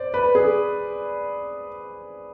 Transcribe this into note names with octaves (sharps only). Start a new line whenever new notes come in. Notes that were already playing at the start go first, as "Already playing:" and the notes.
Already playing: C5 D5
B4
G#4